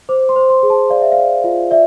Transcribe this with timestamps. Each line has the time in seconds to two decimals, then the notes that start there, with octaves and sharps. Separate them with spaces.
0.09 C5 D6
0.29 C6
0.36 C5
0.50 C6
0.63 G#4
0.70 A5
0.90 D5 F5
1.01 E5
1.12 D5 F5
1.44 F4
1.71 D5 E5